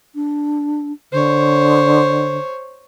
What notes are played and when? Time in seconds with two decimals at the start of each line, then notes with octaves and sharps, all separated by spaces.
0.15 D4
1.12 D3 C5 C#5